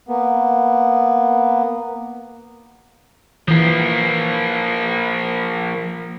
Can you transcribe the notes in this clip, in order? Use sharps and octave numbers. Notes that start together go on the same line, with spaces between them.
A#3 B3
E3 F3 A#3